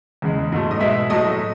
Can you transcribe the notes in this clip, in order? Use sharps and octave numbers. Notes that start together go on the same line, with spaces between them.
E2 C#3 G#3
G#2 F#3 A3
D#5
B2 G#3 E5
A2 F#3 A3 D#5